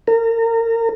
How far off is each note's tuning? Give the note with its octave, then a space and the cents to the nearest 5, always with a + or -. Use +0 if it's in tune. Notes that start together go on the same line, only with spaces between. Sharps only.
A#4 -30